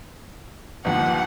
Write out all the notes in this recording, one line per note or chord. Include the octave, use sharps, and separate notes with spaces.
G1 D#2 F3 F#5